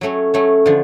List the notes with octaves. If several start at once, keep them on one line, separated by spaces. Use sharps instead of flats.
F#3 A3 C#4
F#3 A3 C#4
D3 F3